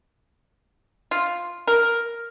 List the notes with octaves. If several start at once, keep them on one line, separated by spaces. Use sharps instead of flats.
F4
A#4